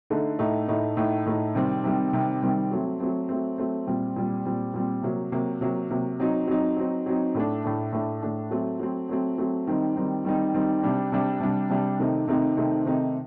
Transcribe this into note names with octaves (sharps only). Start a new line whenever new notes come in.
D3 A3 D#4
A2 A3 D#4
A2 A3 D#4
A2 A3 D#4
A2 A3 D#4
C3 D#3 G3 C4
C3 D#3 G3 C4
C3 D#3 G3 C4
C3 D#3 G3 C4
F#3 A3 C4
F#3 A3 C4
F#3 A3 C4
F#3 A3 C4
A#2 G3 C4
A#2 G3 C4
A#2 G3 C4
A#2 G3 C4
C3 F#3 A#3
C3 F#3 A#3
C3 F#3 A#3
C3 F#3 A#3
F#3 C4 D#4
F#3 C4 D#4
F#3 C4 D#4
F#3 C4 D#4
A2 A3 D4
A2 A3 D4
A2 A3 D4
A2 A3 D4
F#3 A3 C4
F#3 A3 C4
F#3 A3 C4
F#3 A3 C4
D#3 G3 C4 D#4
D#3 G3 C4 D#4
D#3 G3 C4 D#4
D#3 G3 C4 D#4
C3 G3 D4
C3 G3 D4
C3 G3 D4
C3 G3 D4
C3 D#3 A3 C4 D#4
C3 D#3 A3 C4 D#4
C3 D#3 A3 C4 D#4
C3 D#3 A3 C4 D#4